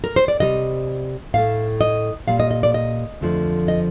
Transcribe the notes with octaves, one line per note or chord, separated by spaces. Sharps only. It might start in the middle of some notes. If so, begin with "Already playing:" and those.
A#4
C5
D5
C3 G3 D#5
A2 A3 F5
D#5
A#2 G3 F5
D#5
D#5
D5
D#5
F2 D3 F3 A3
D#5